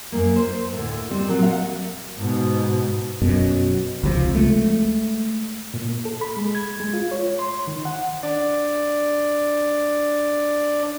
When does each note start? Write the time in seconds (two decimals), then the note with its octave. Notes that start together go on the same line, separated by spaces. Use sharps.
0.12 F#2 A#3
0.36 C5
0.73 D2 A2
1.10 G3 C4
1.28 A#2 F#3
1.43 F5 F#5
2.17 G#2 B2
3.22 F#2 B2
4.03 C#2 C3 F3
4.35 G#3 A3
5.74 A#2
5.89 A#3
6.05 A4
6.21 B5
6.37 G#3
6.55 G#6
6.80 G#3
6.93 F4
7.11 C#5
7.39 C6
7.67 D#3
7.85 F#5
8.23 D4 D5